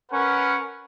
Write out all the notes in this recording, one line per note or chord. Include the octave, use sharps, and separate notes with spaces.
C#4 A#4 B4 F#5